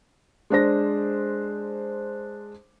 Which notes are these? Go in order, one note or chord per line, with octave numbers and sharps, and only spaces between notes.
G#3 D4 C5 A#6